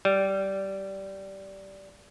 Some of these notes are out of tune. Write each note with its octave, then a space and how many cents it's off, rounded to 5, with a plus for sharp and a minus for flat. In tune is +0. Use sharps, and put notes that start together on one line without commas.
G3 -15